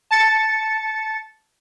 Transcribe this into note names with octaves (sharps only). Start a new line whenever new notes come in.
A5 A6 C#7